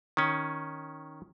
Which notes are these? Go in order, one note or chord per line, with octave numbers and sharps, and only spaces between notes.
D#3 C#4